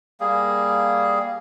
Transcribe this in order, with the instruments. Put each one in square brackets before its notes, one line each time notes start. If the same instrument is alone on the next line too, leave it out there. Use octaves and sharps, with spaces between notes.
[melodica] G3 A#3 G#4